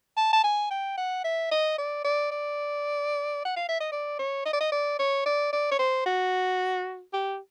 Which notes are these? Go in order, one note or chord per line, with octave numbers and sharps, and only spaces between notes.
A5
A5
G#5
G5
F#5
E5
D#5
D5
D5
D5
F#5
F5
E5
D#5
D5
C#5
D#5
D5
D#5
D5
C#5
D5
D5
C#5
C5
F#4
G4